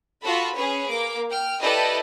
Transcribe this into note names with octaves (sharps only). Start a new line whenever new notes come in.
F4 F#4 A4 B5
C#4 G#4 B4 C#5
A#3 D6
G5 F6
E4 G4 A4 B4 D5 D#5